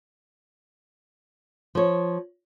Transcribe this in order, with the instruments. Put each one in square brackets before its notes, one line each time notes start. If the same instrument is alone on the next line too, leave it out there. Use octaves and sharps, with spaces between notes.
[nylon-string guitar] F3 C#5